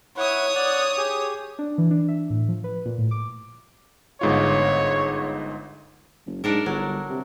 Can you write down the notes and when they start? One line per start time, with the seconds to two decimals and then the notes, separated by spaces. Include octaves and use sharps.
0.17 E4 C#5 F#5 D#6
0.55 D5 F#5
0.98 G4 G#4
1.59 D4
1.78 E3
1.91 D4
2.08 E5
2.30 A2
2.48 F3
2.64 B4
2.85 A#2
2.98 A2
3.11 D6
4.21 G1 G#2 F4 C#5
6.26 F#1
6.44 G#2 D4 A4 A#4
6.66 G1 F#3
7.10 C3